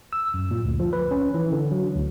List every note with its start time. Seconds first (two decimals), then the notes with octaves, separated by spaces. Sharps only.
0.13 E6
0.34 F#2
0.51 A#2
0.65 D2
0.80 F3
0.93 B4
1.11 C#4
1.34 E3
1.52 D3
1.71 F#3
1.95 D2